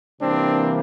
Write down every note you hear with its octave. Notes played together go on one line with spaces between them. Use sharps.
C3 E3 G3 A#3 C4 D4